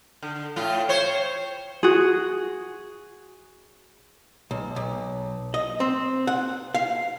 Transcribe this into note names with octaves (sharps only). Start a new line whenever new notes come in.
D3
A2 F4
C5 C#5
F#4 G#4
B1
B1
D#5
C4
F#5
F5